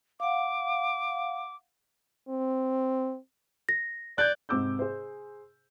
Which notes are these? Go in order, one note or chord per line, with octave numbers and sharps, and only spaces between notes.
F5 F#5 D6
C4
A#6
D5 F#6 G6
G#2 C3 C4 D6 E6 G6
G#4 C5